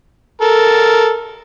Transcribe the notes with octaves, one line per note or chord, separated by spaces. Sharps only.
A4 A#4